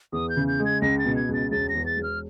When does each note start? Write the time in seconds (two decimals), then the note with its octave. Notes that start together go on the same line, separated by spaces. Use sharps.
0.12 E2 D#6
0.30 G6
0.36 C#3
0.48 G6
0.60 G#3
0.65 G#6
0.82 C#2 A#6
0.99 A6
1.05 B2
1.16 G#6
1.29 C#2 A6
1.51 E1 A6
1.69 A#6
1.75 E2
1.86 A6
1.97 E1
2.03 F6